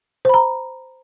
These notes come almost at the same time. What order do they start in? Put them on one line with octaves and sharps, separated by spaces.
C5 B5 A#5